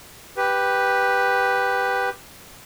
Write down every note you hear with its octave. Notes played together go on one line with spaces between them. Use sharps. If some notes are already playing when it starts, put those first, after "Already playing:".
G4 B4